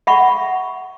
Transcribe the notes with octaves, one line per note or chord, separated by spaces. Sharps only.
E5 F#5 B5 C#6